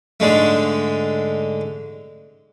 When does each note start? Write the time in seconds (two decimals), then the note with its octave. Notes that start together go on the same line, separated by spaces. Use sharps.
0.20 G#2 D3 G#3 A3